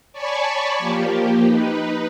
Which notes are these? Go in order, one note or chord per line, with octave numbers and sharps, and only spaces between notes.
C#5 D5 G#5 A5 B5 C#6
F3 A#3 G4
D#4 B4